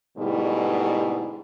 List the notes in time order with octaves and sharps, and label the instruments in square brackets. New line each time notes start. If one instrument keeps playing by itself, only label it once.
[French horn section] G#2 B2 D3 G3 A3 E4